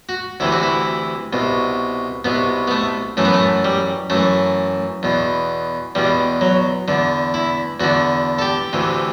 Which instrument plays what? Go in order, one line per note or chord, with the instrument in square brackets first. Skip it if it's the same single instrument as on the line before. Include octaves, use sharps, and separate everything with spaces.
[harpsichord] F#4
D2 C3 E3 E4
F#4
E4
C2 B2
C2 B2 B3
B3
A3
F#2 E3 A3
B3
A3
G3
F#2 E3 A3
E2 B2
E2 B2 G3
F#3
E2 D3
E4
E2 D3 F#4
A4
G4
D2 C3 E3